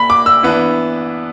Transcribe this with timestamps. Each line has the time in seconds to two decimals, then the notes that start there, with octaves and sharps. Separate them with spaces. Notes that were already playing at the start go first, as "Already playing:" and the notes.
Already playing: A#3 B5
0.10 D6
0.26 E6
0.43 E3 B3 D4